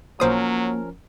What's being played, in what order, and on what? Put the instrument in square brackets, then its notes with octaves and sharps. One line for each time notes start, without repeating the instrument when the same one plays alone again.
[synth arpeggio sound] B1 C5 D#6 [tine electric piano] F3 C#4 A#4 [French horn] F#3 [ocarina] A#3